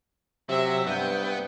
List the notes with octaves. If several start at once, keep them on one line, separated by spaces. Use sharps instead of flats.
C3 F#3 E5
G2 B3 G5